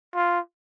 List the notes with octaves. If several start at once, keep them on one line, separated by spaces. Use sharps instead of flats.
F4